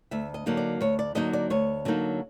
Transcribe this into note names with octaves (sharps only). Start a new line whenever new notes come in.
D2 E5
D#5
D3 F#3 A#3 D#4
D5
D2 C#5
D5
D3 F#3 A#3 D#4 D#5
D5
D2 C#5
D3 F#3 A#3 D#4